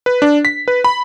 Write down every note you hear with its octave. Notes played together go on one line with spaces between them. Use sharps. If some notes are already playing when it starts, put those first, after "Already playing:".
B4
D4
B6
B4
B5